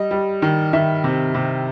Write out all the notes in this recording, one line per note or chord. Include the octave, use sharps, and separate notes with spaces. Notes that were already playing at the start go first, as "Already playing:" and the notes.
Already playing: G3 D#5
G3
D#3
D#3 E5
C3
C3